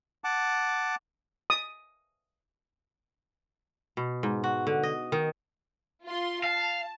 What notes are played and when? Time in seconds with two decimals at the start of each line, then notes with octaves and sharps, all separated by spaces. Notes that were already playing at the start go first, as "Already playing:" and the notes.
0.24 F#5 A5 D6
1.50 D#6
3.97 B2
4.23 G#2
4.44 F#4
4.67 D3
4.83 D#5
5.12 D#3
6.05 F4 C6
6.44 F5 A5